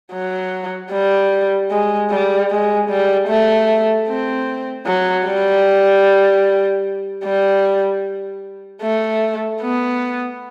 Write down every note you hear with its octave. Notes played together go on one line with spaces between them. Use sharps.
F#3
G3
G#3
G3
G#3
G3
A3
C4
F#3
G3
G3
A3
B3